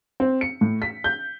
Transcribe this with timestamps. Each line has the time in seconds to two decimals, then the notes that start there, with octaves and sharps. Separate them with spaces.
0.20 C4
0.41 C#7
0.61 A2
0.82 B6
1.04 G6